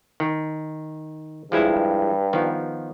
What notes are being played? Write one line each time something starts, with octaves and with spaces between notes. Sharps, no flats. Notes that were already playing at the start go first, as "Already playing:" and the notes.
D#3
G2 F3 G#3 E4
D#3 F3 B3